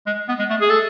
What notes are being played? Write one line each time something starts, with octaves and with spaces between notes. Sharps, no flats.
G#3
B3
G#3
A3
G#4
A4